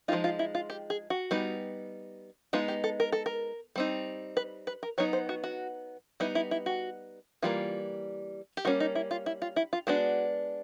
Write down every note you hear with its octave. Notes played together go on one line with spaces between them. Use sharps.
F3 G#3 C4 D#4 F4
F4
E4
F4
G4
G#4
F#4
G3 B3 D#4
G#3 B3 D#4 F4
G4
A4
A#4
A4
A#4
G3 C4 D#4
B4
B4
A#4
F#3 B3 D#4 C#5
C5
F#4
F#4
G3 B3 D#4 E4
E4
E4
F#4
E3 G3 A#3 F4
G4
G3 A#3 C#4 F#4
D#4
E4
F4
E4
F4
E4
F4
G#3 B3 D4 F#4